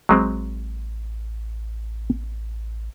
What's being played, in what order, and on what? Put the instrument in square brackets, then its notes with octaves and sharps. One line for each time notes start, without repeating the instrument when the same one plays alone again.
[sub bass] A1 [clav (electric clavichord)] F#3 G#3 C4